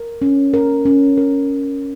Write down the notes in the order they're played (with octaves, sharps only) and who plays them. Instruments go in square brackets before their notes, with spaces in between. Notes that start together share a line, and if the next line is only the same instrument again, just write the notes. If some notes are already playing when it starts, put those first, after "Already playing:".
Already playing: [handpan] A#4
C#4
A#4
C#4
A#4